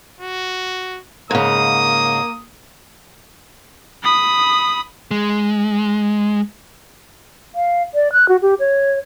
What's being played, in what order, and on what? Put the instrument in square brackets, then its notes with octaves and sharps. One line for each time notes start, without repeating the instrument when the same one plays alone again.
[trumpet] F#4
[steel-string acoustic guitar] G#2 C#3 [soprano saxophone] A#3 [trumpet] D#6
[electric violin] B5 D#6
[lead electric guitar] G#3
[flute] F5
D5
F#6
F#4
G4
C#5